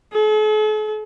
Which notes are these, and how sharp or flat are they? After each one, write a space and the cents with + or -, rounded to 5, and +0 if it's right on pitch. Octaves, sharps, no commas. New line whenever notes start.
A4 -45